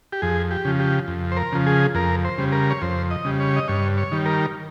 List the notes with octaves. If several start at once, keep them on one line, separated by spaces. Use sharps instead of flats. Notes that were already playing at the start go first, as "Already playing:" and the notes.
G4
F2 G#4
G4
C#3 F3
G4
F2
C5
A#4
C#3 F3
G#4
F2 A#4
C5
C#3 G3
A#4
C#5
F2 C5
D#5
C#3 G3
C#5
D#5
G2 C#5
C#5
D#3 G3
A#4